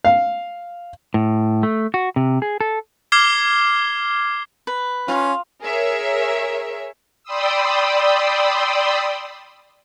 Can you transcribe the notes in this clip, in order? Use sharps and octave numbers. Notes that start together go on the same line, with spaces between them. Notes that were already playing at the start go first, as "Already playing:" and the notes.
F5
A2
A3
F#4
C3
G#4
A4
D6 F6 G#6 C7 G7
B4
C#4 F4
G#4 A#4 C#5 E5
D5 G5 B5 C6 D#6 E6